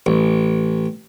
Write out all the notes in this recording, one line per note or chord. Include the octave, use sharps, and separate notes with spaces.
A1